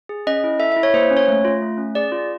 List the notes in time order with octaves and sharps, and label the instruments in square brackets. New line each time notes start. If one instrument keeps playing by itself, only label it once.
[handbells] G#4
C#4 D#5
E4
A4 E5
E5
E4
C#5
A#3 C5
C#4
C#5
A3
F4
A3
C#4
G#4 D5
F4